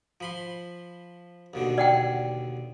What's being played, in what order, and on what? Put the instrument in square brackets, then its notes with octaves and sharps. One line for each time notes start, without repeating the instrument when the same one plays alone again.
[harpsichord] F3 B5 C6
D#2 B2 D3
[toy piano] D5 F#5 G5